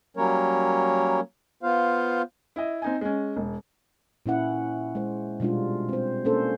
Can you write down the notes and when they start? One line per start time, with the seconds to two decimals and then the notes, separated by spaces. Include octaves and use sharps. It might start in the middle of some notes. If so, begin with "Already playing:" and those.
0.17 F#3 G3 A#3 C#4 A#4 C#5
1.63 B3 F4 C5 F5
2.56 E4 D#5
2.82 C4 D#4 G#5
3.01 G#3 C#4
3.36 E1
4.26 A#2 C#4 E4 F#5
4.95 G#3 C5
5.40 B2 G3 G#3 D4 F4
5.89 C4 C5
6.25 A#3 C#4 D4 A4 C5